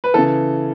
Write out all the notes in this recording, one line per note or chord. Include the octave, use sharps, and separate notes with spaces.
B4
C#3 E3 A4